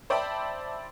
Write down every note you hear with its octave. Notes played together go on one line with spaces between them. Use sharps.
C5 D5 E5 G5 A5 B5